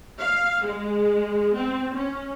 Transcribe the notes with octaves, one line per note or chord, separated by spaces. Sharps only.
F5
G#3
C4
C#4